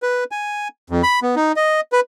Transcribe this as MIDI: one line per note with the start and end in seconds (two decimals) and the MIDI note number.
0.03 0.24 71
0.31 0.68 80
0.90 1.02 41
1.03 1.20 83
1.22 1.35 59
1.36 1.52 63
1.56 1.80 75
1.92 2.00 71